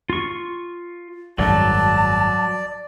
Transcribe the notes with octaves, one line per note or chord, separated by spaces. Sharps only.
F4 C#6
G#1 F#2 F#3 G3 D5 A5